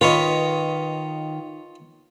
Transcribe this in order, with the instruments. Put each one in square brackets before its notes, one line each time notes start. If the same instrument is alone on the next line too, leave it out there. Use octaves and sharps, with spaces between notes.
[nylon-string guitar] D#3 B4 [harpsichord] F4 C#5 D#5